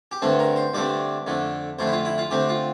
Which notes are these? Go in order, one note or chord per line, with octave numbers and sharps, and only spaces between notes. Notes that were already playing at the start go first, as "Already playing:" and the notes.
G4
G2 D3 A3 C4 A4
A#4
C5
G2 D3 A3 C4 D5
F2 D3 A3
F2 D3 A3 C5
E4
F4
E4
F4
D3 A3 C4 G4
F4